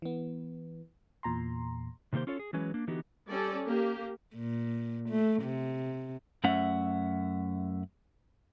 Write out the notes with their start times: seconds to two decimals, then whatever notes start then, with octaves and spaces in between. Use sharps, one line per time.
0.02 E3 B3
1.23 E2 A#2 A#5 C6
2.13 C3 D#3 A#3 G4 C5
2.27 C#4 F4 A4 C#5
2.39 G#4
2.53 E3 F#3 G#3 C#4 B4
2.74 A#3 D4
2.87 D3 E3 B3 D#4 F#4 G4
3.30 G3 C#4 A4 D5
3.65 A#3 G4
4.35 A#2
5.09 A3
5.43 C3
6.44 F#2 A3 C#4 E5 F#5